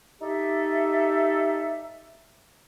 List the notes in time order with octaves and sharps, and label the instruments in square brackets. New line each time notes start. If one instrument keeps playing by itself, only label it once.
[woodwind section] D#4 G4 A4 E5